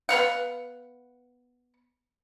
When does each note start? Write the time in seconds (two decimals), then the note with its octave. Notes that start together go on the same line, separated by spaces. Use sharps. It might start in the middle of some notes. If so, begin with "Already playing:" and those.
0.09 B3 B4 F5 F#5